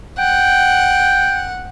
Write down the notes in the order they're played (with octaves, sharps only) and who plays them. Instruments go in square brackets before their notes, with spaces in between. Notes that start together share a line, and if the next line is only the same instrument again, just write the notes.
[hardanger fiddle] F#5 [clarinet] G5